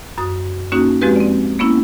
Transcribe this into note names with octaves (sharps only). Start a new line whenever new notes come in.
F#2 F#4 D#6
A#3 C#4 D#4 F#4
F3 G#3 C4 F#4 G4 B4
C4 D5
A#3 B3 C#4 E4